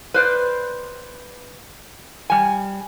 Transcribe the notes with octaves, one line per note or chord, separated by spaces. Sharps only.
B4 C5 D5
G3 G#5